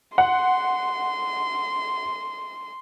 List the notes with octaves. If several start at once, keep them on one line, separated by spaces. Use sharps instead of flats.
F#5 C6